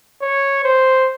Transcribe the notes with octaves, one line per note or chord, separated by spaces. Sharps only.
C#5
C5